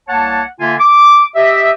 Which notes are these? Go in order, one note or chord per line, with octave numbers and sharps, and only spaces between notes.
C2 A#3 C#5 F#5 A5
D3 A#3 F4 E5 G#5
D6
G4 D#5 E5